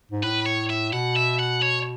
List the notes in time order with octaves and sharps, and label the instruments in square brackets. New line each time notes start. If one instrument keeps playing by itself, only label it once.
[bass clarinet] G#2
[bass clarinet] A2 [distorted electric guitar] B4
[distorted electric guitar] C#5
E5
[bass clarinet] B2 [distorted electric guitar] F#5
[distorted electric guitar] E5
F#5
C#5